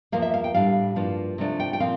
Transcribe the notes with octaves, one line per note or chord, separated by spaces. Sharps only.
E2 C3 F3 A#3 F5
E5
F5
G5
A2 G3 D4 F5
G2 F3 A#3 D4
C3 F3 A3 D4
G5
G5
A#2 F3 C4 F5